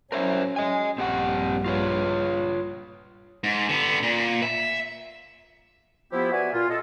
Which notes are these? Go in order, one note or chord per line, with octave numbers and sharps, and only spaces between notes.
F#3 C#4 A#4 C5 E5
D#5 G#5
A#1 G2 C4 G4 F#5
F4 B4 C#5
G#2
D3 B3
A#2
E5
F3 B3 E4 G4
B3 F#4 D5 E5 G#5
A#2 F4
C#4 F4 A4 D#5